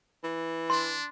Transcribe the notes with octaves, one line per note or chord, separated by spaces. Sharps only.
E3
D4 C6